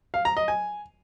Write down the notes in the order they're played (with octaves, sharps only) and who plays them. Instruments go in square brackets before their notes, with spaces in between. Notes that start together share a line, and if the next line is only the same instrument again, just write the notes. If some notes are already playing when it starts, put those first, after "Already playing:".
[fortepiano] F5
A#5
D#5
G#5